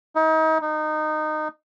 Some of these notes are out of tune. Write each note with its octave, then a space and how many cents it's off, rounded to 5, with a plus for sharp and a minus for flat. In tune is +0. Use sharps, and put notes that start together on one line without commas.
D#4 +35
D#4 -20